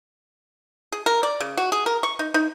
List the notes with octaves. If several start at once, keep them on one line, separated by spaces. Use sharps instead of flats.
G#4
A#4
D5
C#3
F#4
G#4
A#4
C#6
D#4
D#4